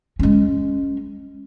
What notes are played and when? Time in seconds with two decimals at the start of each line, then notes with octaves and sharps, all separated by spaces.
0.19 G#3 C#4